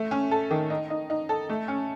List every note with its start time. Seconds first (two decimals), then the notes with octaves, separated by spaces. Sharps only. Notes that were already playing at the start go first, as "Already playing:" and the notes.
Already playing: A3
0.11 C#4
0.31 A4
0.50 D#3
0.70 D#4
0.90 D#4
1.10 D#4
1.29 A4
1.49 A3
1.68 C#4